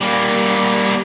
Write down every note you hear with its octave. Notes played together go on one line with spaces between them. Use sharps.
G3 A#3